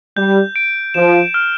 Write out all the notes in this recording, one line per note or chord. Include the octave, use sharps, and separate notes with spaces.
G3 G6
D7
F3 E7
F6